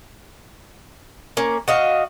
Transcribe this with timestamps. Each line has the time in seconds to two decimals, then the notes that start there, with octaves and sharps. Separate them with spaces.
1.37 A#3 C#4
1.68 F#4 D#5 F5